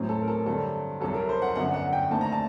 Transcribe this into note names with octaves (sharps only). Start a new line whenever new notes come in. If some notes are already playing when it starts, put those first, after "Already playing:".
Already playing: A1 A2 F#3 C4
A4
A#4
A4
G2 D3 F#3 C4 A4
C2 C3 F#3 A4
A#4
C5
F#5
G1 F#2 D3 F#5
F#5
G5
D#2 D3 A3 C4 A5
A#5
A5